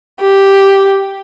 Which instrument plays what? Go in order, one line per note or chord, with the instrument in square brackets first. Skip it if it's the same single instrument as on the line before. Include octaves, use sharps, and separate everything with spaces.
[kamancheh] G4